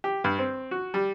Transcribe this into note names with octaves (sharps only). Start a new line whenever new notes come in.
G4
G2
C4
F#4
G3